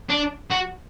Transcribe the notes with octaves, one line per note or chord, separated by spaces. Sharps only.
D4
F#4